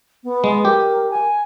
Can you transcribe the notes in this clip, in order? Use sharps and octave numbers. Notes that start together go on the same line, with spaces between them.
B3
G#3
G4 A#4
G#5